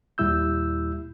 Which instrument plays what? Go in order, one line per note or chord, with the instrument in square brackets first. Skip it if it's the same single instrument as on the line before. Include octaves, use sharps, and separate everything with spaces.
[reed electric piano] D#2 A#2 G3 E4 E6 G6